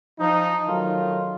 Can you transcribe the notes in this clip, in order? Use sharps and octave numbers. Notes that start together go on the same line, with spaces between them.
F3 D#4
D#3 F#3 A3 F4